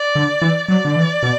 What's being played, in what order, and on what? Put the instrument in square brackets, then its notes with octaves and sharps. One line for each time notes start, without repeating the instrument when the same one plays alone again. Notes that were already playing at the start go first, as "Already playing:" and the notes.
Already playing: [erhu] D5
[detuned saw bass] D3
E3
[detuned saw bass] F#3 [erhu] D5
[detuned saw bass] D3
E3
B2